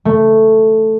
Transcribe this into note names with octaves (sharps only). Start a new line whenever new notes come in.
A3